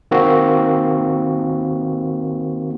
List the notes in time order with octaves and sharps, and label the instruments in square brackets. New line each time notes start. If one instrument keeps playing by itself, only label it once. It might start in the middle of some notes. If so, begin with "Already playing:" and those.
[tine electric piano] D#3 A#3 C4 F#4